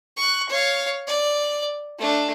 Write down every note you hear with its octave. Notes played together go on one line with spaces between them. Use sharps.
C#6 F#6
C#5 F5
D5
A3 D4